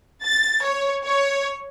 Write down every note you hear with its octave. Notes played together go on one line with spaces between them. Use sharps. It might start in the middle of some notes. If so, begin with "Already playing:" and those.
A6
C#5
C#5